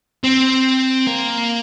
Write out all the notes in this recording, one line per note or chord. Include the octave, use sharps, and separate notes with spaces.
C4
A#3